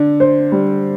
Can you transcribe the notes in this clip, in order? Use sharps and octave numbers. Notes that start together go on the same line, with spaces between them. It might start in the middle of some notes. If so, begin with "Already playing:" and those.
Already playing: D3 D4
C5
G3